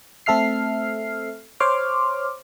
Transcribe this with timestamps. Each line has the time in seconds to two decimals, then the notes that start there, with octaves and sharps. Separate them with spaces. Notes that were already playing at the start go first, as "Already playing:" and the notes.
0.26 A3 C4 A4 E5 F6 C7
1.60 C5 C#5 C6 D6 F6